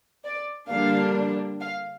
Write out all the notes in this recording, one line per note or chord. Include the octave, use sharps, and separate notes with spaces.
D5
D3 G3 A#3 D4 F5
F5